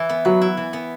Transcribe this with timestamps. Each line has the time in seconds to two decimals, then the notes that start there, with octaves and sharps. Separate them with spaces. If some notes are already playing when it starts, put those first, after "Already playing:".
Already playing: E3 E4
0.09 B3
0.25 F#3 B4
0.42 E4
0.57 E3
0.73 B3